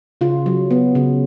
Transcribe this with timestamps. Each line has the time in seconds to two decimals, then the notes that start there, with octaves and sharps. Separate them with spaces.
0.21 C#3 F4
0.46 F#3
0.71 B3
0.95 C#3